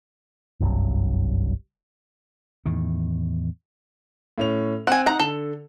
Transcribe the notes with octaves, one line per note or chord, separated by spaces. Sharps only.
F#1 C2 G2 F#3
E2 A2 D#3
A2 C#4 F7
C4 F#5 G#5
D#4 F#5 A#5
D3 A4